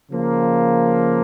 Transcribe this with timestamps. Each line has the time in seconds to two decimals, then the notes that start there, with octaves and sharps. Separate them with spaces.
0.11 C#3 F3 A#3